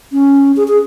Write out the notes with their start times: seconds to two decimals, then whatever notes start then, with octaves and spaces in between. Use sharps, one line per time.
0.13 C#4
0.57 G#4
0.68 G#4